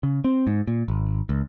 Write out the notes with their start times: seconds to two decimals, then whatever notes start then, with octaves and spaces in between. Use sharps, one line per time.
0.03 C#3
0.24 C4
0.47 G#2
0.67 A#2
0.88 G#1
1.29 C#2